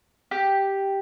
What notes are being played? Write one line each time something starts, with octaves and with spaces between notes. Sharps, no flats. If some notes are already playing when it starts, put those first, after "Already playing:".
G4